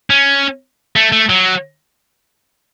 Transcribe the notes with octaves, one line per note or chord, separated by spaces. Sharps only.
C#4
A3
A3
F#3